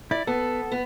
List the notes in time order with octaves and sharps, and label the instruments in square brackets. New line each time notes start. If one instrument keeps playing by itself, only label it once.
[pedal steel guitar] E4 [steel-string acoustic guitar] D5
[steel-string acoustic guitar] B3 [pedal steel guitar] A4
[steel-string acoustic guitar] B3